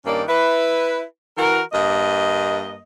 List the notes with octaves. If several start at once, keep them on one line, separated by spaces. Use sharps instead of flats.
G2 D#3 A#3 C#4 D5
E4 B4
E3 F#4 A#4
G2 A#3 D#5